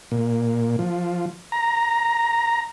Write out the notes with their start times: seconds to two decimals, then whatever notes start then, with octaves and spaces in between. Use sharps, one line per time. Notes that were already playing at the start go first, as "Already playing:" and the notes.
0.12 A#2
0.79 F3
1.52 A#5